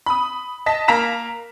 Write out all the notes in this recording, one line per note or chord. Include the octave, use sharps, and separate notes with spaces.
B5 D#6
D#5 A5 B6
A#3 F5 A#5 B6 E7